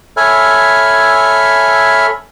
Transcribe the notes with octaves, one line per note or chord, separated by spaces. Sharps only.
A4 C#5 E5 G#5 B5 F6